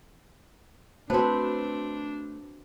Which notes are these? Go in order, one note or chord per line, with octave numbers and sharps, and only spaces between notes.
A3 C4 D4 F#4 B4 C5 A5